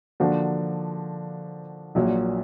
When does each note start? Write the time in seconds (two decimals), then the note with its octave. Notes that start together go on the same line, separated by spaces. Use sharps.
0.20 D3 F3 A#3 D4 F#4
1.95 A#1 A#2 F#3